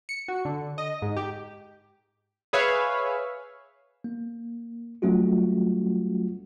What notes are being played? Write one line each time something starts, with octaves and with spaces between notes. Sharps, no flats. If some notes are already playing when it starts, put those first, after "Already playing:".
C#7
F#4
D3
D#5
G#2
G4
G#4 B4 C#5 E5 F5
A#3
F#3 G3 A3 C#4 F4 F#4